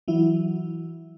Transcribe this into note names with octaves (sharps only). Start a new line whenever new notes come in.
E3 F#3 E4